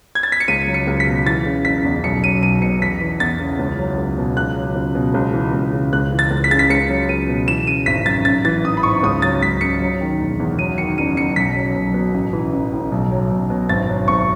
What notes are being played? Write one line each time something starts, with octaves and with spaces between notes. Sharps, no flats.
G#6
A6
B6
C#7
C#2 D#7
F#3
C#7
C#2
B6
B2
E3 A6
C#3
F#1 B6
E2
B1 C#7
F#3 D#7
B1 D#7
B2 C#7
E2 B6
E3
E2 A6
C#3
C#2
F#3
C#2
B2
C#2 F#6
F#3
C#2
B2
C#2
E3
C#2
C#3
C#2 F#6
E3
A6
C#2
B6
C#3 A6
B6
C#2 C#7
F#3
C#2 D#7
B2
E3 E7
C#3 D#7
G#1 B6
F#2 A6
A1 A6
E3 A6
A1 D#6
B5
G#2 C#6
C#2 D#6
F#3 A6
C#2 B6
C#3 C#7
F#3
D#3
E1
E2
F#3 D#7
D#3 C#7
F#1 D#7
F#2 C#7
B1 B6
F#3
B1
B2
A1
E3
A1
A2
B1
F#3
B1
B2
G#1 A6
F#3
G#1 C#6